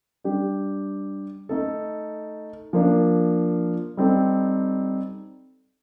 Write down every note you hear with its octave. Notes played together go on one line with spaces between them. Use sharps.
G3 D4 G4
A3 D#4 A4
F3 A#3 D4
G3 C4 D#4 A4